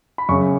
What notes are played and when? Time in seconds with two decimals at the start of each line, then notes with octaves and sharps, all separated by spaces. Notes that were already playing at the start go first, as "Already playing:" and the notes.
0.18 B5
0.29 F#2 C#3 C#6